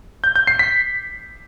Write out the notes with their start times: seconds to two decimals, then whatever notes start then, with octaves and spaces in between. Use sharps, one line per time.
0.24 G6
0.36 G6
0.47 C7
0.59 B6